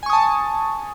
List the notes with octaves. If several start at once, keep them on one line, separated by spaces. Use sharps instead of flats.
G#5 A5 C#6 D#6